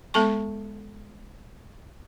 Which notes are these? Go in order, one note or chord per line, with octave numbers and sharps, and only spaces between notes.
G#3 B3 A4 A5 C#6